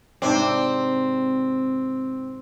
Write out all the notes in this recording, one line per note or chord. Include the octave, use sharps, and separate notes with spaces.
G#2 C3 C4 D4